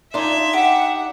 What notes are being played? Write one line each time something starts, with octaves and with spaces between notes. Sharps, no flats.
D4 D#4 F4 E5 G#5
G4 F#5